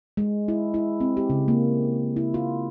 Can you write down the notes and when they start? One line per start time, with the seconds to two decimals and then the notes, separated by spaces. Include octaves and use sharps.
0.17 G#3
0.48 E4
0.74 E4
1.00 C4
1.17 G4
1.30 C#3
1.48 A#3
2.16 E4
2.34 F4